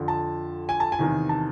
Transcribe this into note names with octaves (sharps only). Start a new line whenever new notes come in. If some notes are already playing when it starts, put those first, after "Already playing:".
Already playing: F2 D3
A5
G#5
A5
G#5
E2 C3 D#3
A5